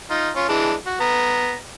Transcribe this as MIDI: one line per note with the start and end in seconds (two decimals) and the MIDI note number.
0.10 0.30 63
0.10 0.30 65
0.36 0.47 61
0.36 0.47 65
0.49 0.73 52
0.49 0.73 56
0.49 0.73 62
0.86 0.98 66
1.00 1.56 59
1.00 1.56 82